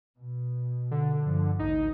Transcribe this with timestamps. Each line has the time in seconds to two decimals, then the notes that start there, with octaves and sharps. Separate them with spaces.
0.16 B2
0.91 D3
1.22 G2 F3
1.59 A1 D2 D#4